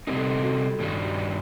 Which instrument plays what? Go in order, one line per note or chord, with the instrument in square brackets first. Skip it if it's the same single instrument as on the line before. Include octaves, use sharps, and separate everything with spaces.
[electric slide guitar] C3 G3 C4 D#4 [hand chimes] G4 A#4
[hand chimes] A4
G4 A#4
F#4 A4
G4
[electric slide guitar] G2 D#3 G3 D4 [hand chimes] F#4
[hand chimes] F#4